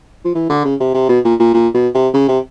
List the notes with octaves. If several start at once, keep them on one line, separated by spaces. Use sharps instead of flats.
F3
E3
D3
C#3
C3
C3
B2
A#2
A#2
A#2
B2
C3
C#3
C3